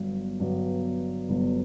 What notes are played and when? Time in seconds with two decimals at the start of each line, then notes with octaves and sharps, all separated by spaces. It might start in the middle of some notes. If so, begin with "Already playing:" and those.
Already playing: G1 G2 F#3 B3
0.40 G1 G2 F#3 B3
1.29 G1 G2 F#3 B3